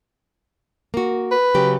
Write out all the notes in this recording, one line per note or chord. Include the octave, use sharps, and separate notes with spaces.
A#3 F#4
B4
C#3 F#3 G4